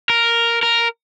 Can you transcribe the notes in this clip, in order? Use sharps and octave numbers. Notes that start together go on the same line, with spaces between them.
A#4
A#4